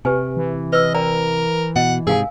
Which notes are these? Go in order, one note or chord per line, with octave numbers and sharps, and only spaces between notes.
C3 G4 B4 G#5
E3
B4 D#5 E6
A#4 D5 G5 A#5
B2 D#5 F#5
G#2 C3 G#4 A#4 F5 G#5